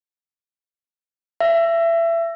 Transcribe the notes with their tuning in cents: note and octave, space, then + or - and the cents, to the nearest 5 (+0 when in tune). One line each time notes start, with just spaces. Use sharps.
E5 +25